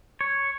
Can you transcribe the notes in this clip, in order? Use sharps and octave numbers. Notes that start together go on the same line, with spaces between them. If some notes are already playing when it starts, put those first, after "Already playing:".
C#5